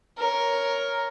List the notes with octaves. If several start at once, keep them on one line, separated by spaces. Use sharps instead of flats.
A#4 C#5